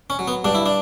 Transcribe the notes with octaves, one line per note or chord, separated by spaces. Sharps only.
C#4
F#3
B3
G2 D4
E4
D4